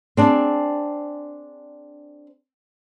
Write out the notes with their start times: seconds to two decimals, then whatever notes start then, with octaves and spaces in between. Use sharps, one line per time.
0.17 C4 D4 G#4